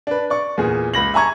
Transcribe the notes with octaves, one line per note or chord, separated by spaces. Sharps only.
D4 B4
D5 C#6
E2 A#2 G#4
C#2 B5 A#6 F#7
E5 G#5 A#5 C#6 G#6